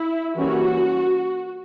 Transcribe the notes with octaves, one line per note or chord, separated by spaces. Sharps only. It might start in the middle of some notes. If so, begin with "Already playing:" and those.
Already playing: E4
E3 G3 A#3 C#4 F#4